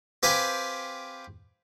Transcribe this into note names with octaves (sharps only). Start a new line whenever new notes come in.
C4 G4 B4 C5 F5 G#5